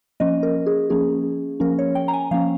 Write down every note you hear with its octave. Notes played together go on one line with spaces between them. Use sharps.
F3 A#3 C#4 D#5
A#4
G#4
F3 A#3 C#4 G#4
F3 A#3 C#4 A#4
C#5
G5
A#5
G#5
F3 A#3 C#4 F5